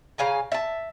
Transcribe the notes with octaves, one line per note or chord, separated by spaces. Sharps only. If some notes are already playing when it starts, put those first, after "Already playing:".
C#3 F5 G#5 A#5
E5 A5